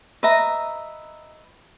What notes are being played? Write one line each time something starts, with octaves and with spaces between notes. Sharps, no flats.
B4 D#5 E5 A#5